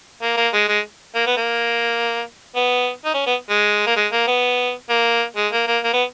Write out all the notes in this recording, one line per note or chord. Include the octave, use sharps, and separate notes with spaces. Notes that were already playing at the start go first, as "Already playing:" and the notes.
A#3
A#3
G#3
G#3
A#3
B3
A#3
B3
D#4
C#4
B3
G#3
A#3
G#3
A#3
B3
A#3
G#3
A#3
A#3
A#3
B3